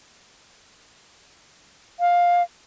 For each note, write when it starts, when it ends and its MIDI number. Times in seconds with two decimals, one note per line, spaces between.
2.00 2.43 77